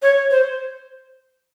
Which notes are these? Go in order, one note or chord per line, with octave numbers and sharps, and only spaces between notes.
C#5
C5